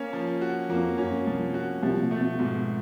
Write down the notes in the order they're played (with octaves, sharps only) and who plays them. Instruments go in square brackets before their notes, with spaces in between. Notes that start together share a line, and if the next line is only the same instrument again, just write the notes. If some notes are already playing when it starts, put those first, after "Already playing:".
Already playing: [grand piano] A#3 C#4
F3
F#4
[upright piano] F2 F3 [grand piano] A#3
[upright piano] F#2 F#3 [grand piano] C#4
[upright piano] C2 C3 [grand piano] F3
[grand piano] F#4
[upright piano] C2 C3 [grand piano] F3
[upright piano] A#2
[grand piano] A3
[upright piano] B2
[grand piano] G#2 [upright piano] B2